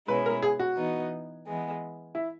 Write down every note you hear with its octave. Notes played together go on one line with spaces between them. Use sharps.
B2 G#3 C#4 E4 B4
A#4
G#4
F#4
E3 B3 D#4
E3 G#3 B3
E4